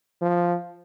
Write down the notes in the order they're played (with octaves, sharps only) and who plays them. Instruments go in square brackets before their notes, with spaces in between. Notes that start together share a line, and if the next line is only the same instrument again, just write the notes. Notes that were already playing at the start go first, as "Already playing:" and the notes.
[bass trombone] F3